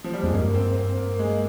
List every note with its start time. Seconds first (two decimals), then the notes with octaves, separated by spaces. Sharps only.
0.04 F3
0.13 G3
0.23 F2 G#3
0.33 G2 A#3
0.54 C4
0.76 C4
0.97 A#3
1.19 G#3